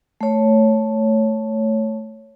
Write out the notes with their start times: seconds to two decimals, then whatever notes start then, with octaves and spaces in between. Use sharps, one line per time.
0.21 A3 C#5